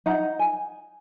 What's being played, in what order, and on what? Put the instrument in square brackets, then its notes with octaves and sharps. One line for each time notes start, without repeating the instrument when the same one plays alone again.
[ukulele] D#4 F#5 A#5
G#5